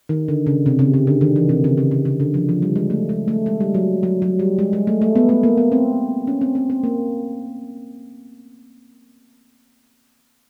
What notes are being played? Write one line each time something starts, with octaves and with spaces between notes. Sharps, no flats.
D#3
D3
C#3
C3
C#3
C#3
D3
D#3
E3
C3
C#3
C#3
C#3
C#3
D3
F3
F3
G3
G#3
A3
G#3
A3
G#3
G3
F#3
F#3
F#3
G3
G#3
G#3
A3
A3
B3
A3
A#3
B3
C4
C#4
C4
C4
C4
A#3